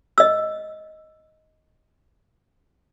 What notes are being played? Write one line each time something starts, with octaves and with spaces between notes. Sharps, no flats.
D#5 E6